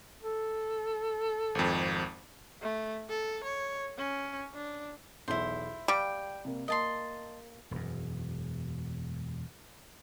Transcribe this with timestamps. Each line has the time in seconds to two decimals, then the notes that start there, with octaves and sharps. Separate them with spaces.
0.22 A4
1.55 G#1 F2
2.62 A3
3.09 A4
3.44 C#5
3.98 C#4
4.54 D4
5.28 B1 E2 E4 C5
5.88 G3 F5 G5
6.45 C3 A#3
6.68 A#3 D#5 A5 C6
7.71 E1 F#2